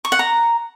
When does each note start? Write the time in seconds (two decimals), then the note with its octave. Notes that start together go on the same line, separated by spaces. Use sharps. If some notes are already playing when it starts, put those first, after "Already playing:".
0.05 C#6
0.12 F#5
0.19 A#5